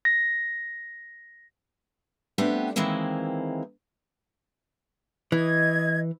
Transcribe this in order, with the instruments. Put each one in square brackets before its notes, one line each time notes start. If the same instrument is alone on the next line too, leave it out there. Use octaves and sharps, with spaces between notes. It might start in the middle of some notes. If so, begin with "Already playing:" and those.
[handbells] A#6
[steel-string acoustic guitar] A3 B3 C4 D4 G4
D#3 E3 G#3 A#3 C4 E4
[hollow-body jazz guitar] E3 [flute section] D#5 G#6